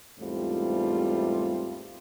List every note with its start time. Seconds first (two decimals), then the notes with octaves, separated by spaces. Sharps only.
0.19 E2 G#2 G3 A3 C4 F4